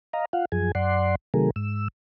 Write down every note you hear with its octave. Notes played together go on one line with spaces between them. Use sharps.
D#5 F5 A#5
F4 F5 F#5
F#2 F3 G#4 G#5
F#2 D5 F#5 C6
C3 D#3 F#3 A3 G#4 A#4
G#2 E6